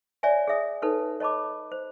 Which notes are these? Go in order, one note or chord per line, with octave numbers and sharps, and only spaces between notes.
C#5 D5 E5 G#5
G#4 D5 E5 D#6
D#4 A4 B4 C#5
C#5 D#5 A5 B5 D6
C5